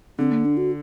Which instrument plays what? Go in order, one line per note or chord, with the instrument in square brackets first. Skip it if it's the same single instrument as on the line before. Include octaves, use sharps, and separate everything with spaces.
[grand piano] D3 [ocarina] C4
[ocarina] A#3
D4
F#4